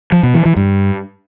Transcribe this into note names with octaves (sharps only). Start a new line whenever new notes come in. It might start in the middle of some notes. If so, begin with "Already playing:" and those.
F3
B2
E3
E3
G2